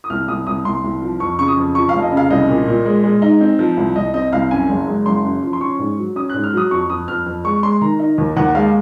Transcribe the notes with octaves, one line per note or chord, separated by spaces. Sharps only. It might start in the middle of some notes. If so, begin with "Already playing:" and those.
D#6
C2 F6
C2 D#6
C2 D#6
C2 C6
C2
F3
F2 C#6
C#3 C#6
D#6
F2
F3 C#6
F5
F1
D#5
C#3
F5
C2 D#5
A#2
A#2
G#3
G#3
D#4
C4
F3
C2
C2 D#5
C4 D#5
C2 F5
F#2 G#5
F#1
G#3
F#1 C6
F#2
F3
C6
C#4 C#6
G#2
F#3
C#4 D#6
F#6
G#2
F6
F#3 D#6
F2 C#6
F2 D#6
F2 F6
F2
G#3 C#6
G#3 C6
D#3 A#5
D#4
D#2
D#2 F#5
G#3 F5